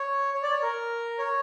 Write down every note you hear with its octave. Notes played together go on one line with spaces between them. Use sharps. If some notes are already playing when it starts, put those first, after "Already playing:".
Already playing: C#5
C#5
D5
C#5
A#4
C#5